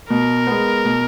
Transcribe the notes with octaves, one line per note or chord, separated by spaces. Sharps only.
B2 A#4
G#3 B3
B2